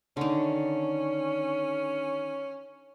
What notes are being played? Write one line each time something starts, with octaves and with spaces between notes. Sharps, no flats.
D3 D#3 C#4